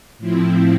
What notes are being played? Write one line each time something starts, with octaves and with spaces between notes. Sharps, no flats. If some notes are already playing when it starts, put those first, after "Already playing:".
A2 F3 C4 E4